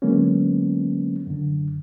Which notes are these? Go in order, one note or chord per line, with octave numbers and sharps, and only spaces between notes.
D3 F#3 G#3 A#3 B3 C#4
F#2 D3